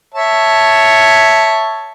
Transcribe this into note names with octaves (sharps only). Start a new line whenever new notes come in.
C#5 E5 A5